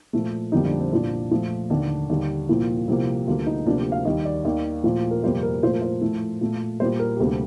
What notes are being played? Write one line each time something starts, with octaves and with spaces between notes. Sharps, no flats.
A#2 F3 A3
F2 D3 G3 A#3 D#4
D4
C4
C2 A#2 F3 D4
A#2 F3 A3
D#2 D3 A3 D4
D#2 D3 G3
C2 A#2 F3 A#3
C2 C3 F3 A#3
D2 D3 G3 A#3 F4
D#4
D2 C3 F3 A#3 D4
G4
F5
D#2 D#3 G3 D#5
D5
D#2 D#3 A#3 D5
A#2 F3 A3
A#4
F2 C3 G3 A#3 C5
A#4
A#2 F3 A3 C5
A#4
C5
A2 F3 A3
A#2 A3
A#2 G3 A#3 C5
A#4
G4
D2 C3 G3 A#3 A4